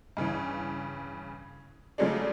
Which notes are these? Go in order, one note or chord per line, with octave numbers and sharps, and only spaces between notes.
G2 C#3 E3
C#3 F3 F#3 G#3 A3 D4